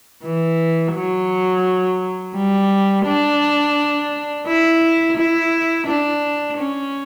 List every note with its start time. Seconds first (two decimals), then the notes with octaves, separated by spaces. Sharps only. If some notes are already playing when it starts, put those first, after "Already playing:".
0.24 E3
0.94 F#3
2.35 G3
3.06 D4
4.47 E4
5.17 E4
5.87 D4
6.58 C#4